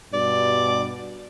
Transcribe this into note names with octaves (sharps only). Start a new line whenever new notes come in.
G2 B2 D5